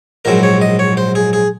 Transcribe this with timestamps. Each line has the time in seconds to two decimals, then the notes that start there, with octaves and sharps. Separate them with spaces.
0.25 A#1 G#2 F#3 C4 A#4
0.43 C#5
0.61 D#5
0.79 C#5
0.97 C5
1.15 G#4
1.33 G#4